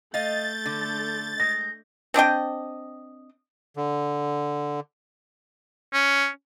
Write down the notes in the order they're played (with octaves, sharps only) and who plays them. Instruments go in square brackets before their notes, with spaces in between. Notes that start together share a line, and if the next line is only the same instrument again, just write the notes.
[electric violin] A3 G6 [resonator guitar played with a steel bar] D#5 F5 [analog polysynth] A6
[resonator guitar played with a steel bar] D3
[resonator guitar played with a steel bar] G#3 [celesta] A#6
[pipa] C4 D4 D#5 G5
[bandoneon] D3
[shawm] C#4